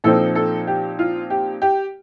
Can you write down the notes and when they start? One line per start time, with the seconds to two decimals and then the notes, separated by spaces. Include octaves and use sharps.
0.04 A#2 F3 C4 D#4 A4
0.35 A4
0.67 G4
0.99 F4
1.30 G4
1.62 G4